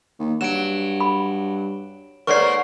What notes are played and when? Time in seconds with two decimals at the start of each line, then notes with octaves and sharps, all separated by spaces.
0.20 D#2
0.41 G2 F#3 D7 E7
1.00 B5
2.27 G#2 A#3 B4 C#5 D5 C#6 C7